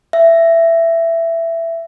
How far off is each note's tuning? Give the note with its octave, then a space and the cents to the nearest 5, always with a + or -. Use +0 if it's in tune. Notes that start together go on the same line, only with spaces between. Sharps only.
E5 +15